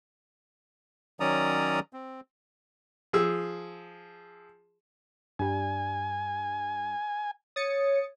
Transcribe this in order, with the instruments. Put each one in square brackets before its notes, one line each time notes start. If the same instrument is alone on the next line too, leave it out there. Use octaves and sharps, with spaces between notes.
[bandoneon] D#3 F#3 C#4 D5 A#5 D#6
C4
[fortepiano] F3 G#4 E6
[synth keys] G2 G3 [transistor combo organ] G#5
[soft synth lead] C#5 [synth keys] D#6 A6 C#7